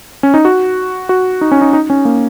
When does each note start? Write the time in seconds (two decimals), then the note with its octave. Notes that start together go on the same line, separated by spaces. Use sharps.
0.23 C#4
0.34 D#4
0.45 F#4
1.09 F#4
1.41 D#4
1.52 C#4
1.61 D#4
1.73 D#4
1.90 C#4
2.05 A#3